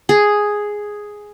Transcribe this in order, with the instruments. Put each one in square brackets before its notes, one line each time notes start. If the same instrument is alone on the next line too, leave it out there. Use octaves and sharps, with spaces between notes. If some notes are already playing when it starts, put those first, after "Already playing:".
[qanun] G#4